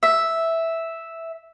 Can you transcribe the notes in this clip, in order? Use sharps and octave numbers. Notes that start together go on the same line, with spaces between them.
E5